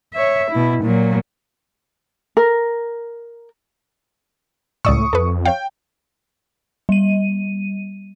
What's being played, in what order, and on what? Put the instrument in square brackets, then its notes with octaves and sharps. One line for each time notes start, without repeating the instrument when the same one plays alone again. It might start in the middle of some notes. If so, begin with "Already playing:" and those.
[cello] C#5 E5
B2 E4
A#2 F#3
[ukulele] A#4
[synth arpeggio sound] C#2 D5 E6 [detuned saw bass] A2 [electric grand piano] C#6 D#6
[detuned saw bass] F2 [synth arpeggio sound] A4 B4
[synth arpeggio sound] C#5 F5 [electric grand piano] G5
[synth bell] G3 D#7